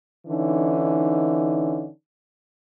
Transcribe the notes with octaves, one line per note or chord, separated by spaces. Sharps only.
D3 E3 C#4 D#4